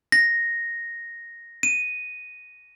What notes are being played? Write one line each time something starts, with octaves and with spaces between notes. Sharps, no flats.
A#6
D#7